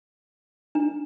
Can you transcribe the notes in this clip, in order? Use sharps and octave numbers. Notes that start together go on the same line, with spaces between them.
D4